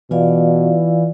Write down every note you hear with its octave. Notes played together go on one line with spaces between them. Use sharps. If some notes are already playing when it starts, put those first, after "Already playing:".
B2 E3 F4 D5 F5